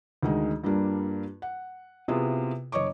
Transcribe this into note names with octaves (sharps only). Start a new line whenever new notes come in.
D2 D#3 G#3
G2 G3 A#3 D4 F4
F#5
C3 B3 E4 F4 G#4
F#1 C#5 D#5 C#6 D6